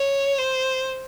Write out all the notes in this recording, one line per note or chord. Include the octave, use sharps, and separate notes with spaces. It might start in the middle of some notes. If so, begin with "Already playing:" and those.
Already playing: C#5
C5